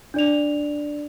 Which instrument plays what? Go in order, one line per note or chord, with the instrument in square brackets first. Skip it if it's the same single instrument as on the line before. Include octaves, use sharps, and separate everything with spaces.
[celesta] D4 D5 F7